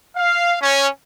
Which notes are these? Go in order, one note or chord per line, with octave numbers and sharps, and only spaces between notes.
F5
C#4